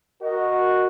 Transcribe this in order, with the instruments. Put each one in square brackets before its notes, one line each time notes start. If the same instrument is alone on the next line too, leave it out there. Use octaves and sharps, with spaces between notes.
[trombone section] F#4 [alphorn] A#4 [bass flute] D#5